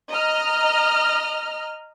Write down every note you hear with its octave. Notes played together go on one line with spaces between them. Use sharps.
D#5 A#5 F6